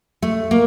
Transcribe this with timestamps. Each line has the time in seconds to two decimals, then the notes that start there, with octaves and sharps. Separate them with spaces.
0.22 A3
0.51 A#3